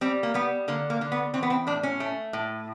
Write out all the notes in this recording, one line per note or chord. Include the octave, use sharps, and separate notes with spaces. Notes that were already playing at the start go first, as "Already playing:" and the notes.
G3 C4
A#3
G3 B3
D3 A#3
A#3
D3
B3
E3 C4
B3
C4
A2 D4
C#4
A3
A2